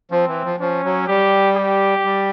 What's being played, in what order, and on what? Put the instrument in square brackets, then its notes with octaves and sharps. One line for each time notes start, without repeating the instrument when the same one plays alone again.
[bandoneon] F3 [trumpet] C4
[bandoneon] E3
F3
[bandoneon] F3 [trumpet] C#4
[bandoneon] F#3
[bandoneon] G3 [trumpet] G4
[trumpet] G4
[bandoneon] G3